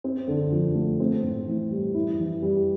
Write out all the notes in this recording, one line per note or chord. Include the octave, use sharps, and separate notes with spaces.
C4
D3
F3
A3
C4
A2
E3
G3
E4
E3
G3